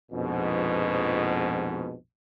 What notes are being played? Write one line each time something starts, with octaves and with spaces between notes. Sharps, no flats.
A#1 F2 G#2 B2